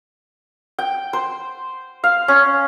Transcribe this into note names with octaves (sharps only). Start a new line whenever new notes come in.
G5
C5
F5
C#4